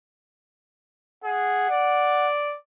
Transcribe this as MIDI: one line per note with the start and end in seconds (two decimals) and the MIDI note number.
1.24 1.67 68
1.24 2.28 78
1.70 2.56 74